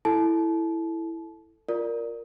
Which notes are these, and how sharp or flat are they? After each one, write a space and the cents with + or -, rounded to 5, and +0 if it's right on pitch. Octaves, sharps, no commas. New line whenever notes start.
E4 +0 A4 +0 A5 -30
F4 +0 A#4 +0 D5 +0